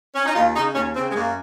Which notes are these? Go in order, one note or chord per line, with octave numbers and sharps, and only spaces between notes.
C#4
D#4
D#2 F4
C#3 D#4
D#2 C#4
C#3 C4
G#3
F#2 A#3